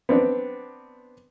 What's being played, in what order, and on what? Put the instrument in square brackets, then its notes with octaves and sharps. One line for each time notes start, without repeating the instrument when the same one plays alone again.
[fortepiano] B3 C4 D4